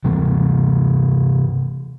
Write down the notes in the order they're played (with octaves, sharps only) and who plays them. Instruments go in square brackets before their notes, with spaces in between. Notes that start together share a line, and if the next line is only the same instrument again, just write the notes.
[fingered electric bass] C3 E3 A3